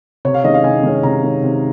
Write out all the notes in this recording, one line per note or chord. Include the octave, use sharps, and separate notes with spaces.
C3 C#5
F5
D#3 G#3 C#4 D#5
F5
C3 G#5
D#3 G#3 C#4
C3 A#5
D#3 G#3 C#4
C3